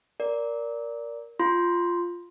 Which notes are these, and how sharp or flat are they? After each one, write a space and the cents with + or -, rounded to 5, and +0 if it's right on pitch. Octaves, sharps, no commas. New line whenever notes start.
A#4 +0 D5 -15
F4 +0 C6 +0